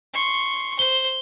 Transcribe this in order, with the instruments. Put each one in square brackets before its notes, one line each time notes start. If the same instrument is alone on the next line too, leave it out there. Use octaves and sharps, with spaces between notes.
[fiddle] C6 C#6
[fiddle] C5 [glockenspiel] G7